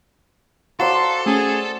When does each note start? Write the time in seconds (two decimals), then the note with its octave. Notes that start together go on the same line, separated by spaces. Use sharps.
0.80 F#4 A4 C5 D5 F5 A#5 C6
1.26 A3 C#4 G#4